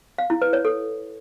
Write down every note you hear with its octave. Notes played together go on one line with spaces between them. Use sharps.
F5
E4
B4
C#5
A4